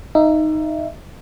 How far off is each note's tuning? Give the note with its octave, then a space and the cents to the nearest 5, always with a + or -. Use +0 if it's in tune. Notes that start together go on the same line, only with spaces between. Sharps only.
D#4 +0 E5 +25